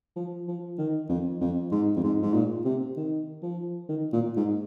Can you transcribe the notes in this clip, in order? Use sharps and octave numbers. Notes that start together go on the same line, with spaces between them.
F3
F3
D#3
F2
F2
G#2
F2
G#2
G#2
A#2
C3
D#3
F3
D#3
A#2
G#2